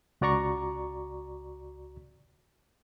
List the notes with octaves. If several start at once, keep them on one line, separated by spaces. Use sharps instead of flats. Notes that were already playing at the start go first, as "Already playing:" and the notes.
C#2 F#4 D5 A#5 C#6